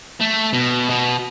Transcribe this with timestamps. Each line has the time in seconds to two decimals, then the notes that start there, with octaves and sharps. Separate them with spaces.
0.20 A3
0.53 B2
0.90 B2